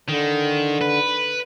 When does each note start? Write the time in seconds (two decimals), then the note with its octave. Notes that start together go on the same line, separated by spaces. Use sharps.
0.09 D3 D#3
0.81 B4